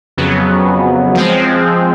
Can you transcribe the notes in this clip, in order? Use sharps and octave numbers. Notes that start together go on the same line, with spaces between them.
F2 C#3 F#3 B3
F3 G#3 C4